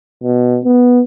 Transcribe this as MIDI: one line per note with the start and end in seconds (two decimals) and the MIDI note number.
0.23 0.59 47
0.64 1.02 59